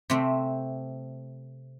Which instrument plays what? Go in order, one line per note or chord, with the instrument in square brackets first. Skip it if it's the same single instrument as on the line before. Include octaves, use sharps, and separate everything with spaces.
[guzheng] C3 A3 C4